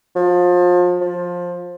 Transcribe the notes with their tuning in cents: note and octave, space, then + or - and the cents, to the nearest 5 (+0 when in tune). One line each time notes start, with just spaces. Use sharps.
F3 +30
F3 +15